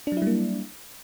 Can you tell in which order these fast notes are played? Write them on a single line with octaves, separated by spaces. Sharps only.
D4 F#3 E4 G3 A#3